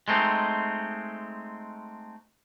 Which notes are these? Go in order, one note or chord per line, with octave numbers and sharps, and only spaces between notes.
G#3 A3 C4 D#4